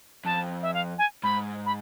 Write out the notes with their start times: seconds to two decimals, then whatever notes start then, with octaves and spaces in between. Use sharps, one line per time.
0.25 F2 A5
0.62 E5
0.74 F5
0.98 G#5
1.23 G#2 B5
1.66 B5